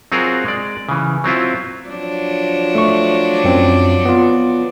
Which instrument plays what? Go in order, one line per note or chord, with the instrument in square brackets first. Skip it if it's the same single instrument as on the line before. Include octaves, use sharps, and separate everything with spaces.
[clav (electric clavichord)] F#3 C4 F4 F#4 G#4 A#4
G#3 D5
C#3 E3
F#3 C4 E4 F4
[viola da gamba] F3 F#3 D4
[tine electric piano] A3 C#6
F#2 C4
B3 F4